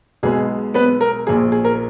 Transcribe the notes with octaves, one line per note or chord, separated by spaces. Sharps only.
B1 B2 G#3 B3 G#4
B3 B4
A#4
A#1 A#2 F3 G#4
G#4
A#4